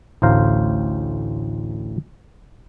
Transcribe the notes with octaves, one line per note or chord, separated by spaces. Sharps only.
A1 D2 A2 C5 F5 A#5